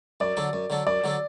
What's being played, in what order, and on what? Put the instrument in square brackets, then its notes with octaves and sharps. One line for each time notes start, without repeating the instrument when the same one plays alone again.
[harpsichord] F#2 [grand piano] D5
[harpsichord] D3 F#3 D4 A4
F#2
D3 F#3 D4 A4
[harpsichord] F#2 [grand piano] D5
[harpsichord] D3 F#3 D4 A4